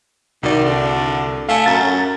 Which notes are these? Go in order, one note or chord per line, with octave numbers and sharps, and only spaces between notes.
C2 D#3 F#4 D5
D3
A3 F5 G#5 C#7
F#2 A#5 A6